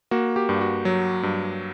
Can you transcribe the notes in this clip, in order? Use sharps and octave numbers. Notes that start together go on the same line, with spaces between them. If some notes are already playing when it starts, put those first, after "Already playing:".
A#3 F#4
G4
G2
F#4
F#3
G2